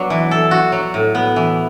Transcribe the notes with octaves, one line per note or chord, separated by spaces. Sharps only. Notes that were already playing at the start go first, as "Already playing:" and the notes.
Already playing: F#3 B3 D4
E3
A4
F#4
F#3
A2
B3
E3